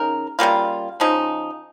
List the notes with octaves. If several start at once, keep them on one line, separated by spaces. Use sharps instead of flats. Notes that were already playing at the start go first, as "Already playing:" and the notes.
Already playing: C#3 D#4 A#4
C#3 G3 A#3 F4
C#3 F3 G#3 D#4